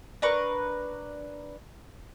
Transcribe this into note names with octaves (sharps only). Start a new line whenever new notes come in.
D4 A#4 B4 C#6